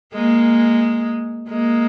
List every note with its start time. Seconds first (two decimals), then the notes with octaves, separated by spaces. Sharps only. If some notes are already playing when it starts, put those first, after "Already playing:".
0.13 G#3 A#3
1.49 G#3 A#3